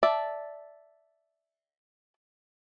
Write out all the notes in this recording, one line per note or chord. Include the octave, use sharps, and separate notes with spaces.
D5 E5 A5